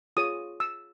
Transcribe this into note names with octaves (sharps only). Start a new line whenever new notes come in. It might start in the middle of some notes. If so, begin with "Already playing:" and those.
F4 G#4 C#5 D#6
E6